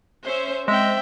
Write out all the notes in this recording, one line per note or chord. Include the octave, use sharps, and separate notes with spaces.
C#4 C5 E5
G#3 C4 E5 G5